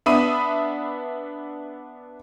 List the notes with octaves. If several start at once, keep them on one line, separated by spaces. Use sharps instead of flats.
B3 D4 E5 B5 D#6 D#7